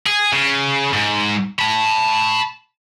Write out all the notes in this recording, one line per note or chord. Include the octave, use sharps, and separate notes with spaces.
G#4
C#3
G#2
A5 B5